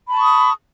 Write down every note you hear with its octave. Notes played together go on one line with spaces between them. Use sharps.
A5 B5 C#6 D#6